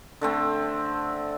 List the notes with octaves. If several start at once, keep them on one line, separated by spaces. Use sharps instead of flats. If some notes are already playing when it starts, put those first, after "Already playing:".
D3 A3 C4